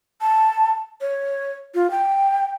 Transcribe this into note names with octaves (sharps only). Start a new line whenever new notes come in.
A5
C#5
F4
G5